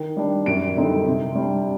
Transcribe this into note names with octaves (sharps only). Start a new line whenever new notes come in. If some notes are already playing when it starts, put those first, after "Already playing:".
Already playing: D#3
G3 D4
F#2 D7
D3 G3 C4 D#4
C3
G3
D4